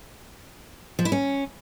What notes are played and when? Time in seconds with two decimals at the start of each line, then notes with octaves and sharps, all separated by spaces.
0.99 F3
1.05 E4
1.12 C#4